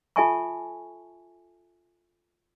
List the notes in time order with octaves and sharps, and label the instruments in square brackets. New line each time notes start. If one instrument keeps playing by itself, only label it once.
[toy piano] F4 A4 E5 G#5 A5 C#6